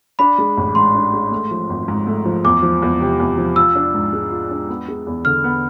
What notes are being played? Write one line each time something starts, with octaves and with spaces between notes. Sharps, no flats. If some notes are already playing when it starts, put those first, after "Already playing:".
D4 B5
G#3
A1
G#2 C6
D4
G#3
A3
F3
G#1
G#2
A3
F3
E2 D6
F3
E2
C3
E2
F3
F4 E6
D4
G#2
G#3
F4
D4
B3
G#3
E2
D3 F6
B3